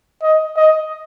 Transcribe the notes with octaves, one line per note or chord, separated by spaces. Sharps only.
D#5
D#5